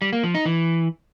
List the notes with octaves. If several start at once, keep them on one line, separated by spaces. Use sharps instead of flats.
G3
A#3
F3
D#4
E3